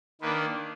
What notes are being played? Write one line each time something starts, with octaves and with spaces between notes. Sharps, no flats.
D#3 A#3 D4 B4